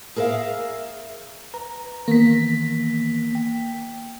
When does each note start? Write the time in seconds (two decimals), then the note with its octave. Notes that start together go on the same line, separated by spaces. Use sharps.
0.16 G#4 A#4 B4 E5 F5
1.54 B4 A#5
2.08 D#3 E3 A#3 B3 B6
3.35 G5